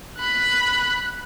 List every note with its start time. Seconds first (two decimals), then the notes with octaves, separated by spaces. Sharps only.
0.18 B5 F#6